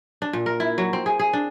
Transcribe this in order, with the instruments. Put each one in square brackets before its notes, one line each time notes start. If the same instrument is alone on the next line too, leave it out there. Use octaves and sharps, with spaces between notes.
[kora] D4
A#2
A#4
E4
F#3
C4
G#4
G#4
D4